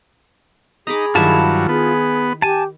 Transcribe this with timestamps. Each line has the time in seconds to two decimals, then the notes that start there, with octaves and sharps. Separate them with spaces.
0.87 D#4 G#4 A#5 B5 D6
1.15 G2 D#3 F#3 E4 F4 E5 A5
1.69 B3 G#4
2.42 G4 G#5 A5